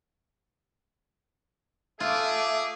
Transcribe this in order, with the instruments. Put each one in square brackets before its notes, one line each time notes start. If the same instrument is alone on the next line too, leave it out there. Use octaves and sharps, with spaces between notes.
[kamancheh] A3 D6 [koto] F4 [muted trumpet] G#4 [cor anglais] E5